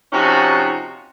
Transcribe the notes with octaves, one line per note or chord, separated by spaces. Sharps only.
C3 F3 C#4 D#4 F#4